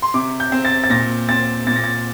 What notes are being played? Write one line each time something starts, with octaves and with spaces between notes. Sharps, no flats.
C6
C3 D6
G6
C4
A6
A6
A#2 A#6
C4 A6
A#2 A6
A#6
A6